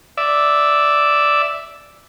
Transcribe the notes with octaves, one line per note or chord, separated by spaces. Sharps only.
D5 E5